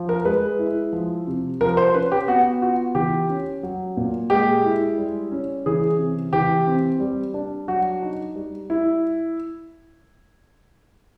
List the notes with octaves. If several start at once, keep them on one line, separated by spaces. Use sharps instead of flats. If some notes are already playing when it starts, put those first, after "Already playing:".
Already playing: F3
A#4
G#3 B4
E4
F3
C3
F3 A#4
C5
C#4 B4
G4
B3 F#4
F4 F#4
E3 G4
C#4
F#3
A#2
G#3 G4
E4
G3
C#4
E3 G#4
C3
E3 G4
C4
G3
D4
F#3 F#4
D#4
G3
E4